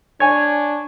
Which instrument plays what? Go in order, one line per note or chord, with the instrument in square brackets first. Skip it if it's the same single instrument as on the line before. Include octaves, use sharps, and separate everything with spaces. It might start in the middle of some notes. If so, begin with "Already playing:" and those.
[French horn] D4 [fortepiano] C#5 G#5 [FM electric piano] G#6